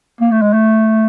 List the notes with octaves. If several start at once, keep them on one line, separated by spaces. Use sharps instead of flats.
A#3
A3
G#3
A3